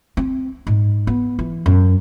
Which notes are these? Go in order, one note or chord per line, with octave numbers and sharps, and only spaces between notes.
C4
G#2
B3
E3
F#2